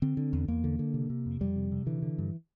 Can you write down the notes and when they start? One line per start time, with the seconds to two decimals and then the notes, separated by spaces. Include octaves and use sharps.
0.02 D3 C4
0.17 D3
0.33 E2
0.48 E2 A#3
0.64 D3
0.79 D3
0.94 C3
1.10 C3
1.26 F2
1.41 F2 G3
1.56 C3
1.72 C3
1.87 D3 E3
2.02 D3
2.18 G2